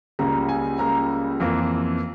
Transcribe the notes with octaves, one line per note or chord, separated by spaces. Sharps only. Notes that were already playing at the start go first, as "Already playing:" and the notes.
C#2 C#3 G3 A#3 A#5
G#5
C#2 C#3 G3 A#3 A#5
F2 E3 A#3